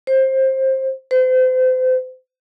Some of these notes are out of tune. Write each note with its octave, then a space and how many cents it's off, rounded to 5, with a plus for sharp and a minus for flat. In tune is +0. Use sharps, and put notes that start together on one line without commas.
C5 +20
C5 -35